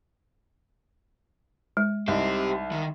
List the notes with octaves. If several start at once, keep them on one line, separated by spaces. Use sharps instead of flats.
G#3
C2 D#4 G4 C5
D#3